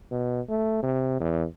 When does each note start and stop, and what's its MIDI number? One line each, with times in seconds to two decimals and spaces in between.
0.11 0.41 47
0.49 0.80 57
0.83 1.16 48
1.20 1.44 40